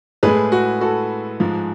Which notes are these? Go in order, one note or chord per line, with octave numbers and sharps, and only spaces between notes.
A2 G#3 G#4 B4
F#4
F#4 A4
G#2 F3 G#3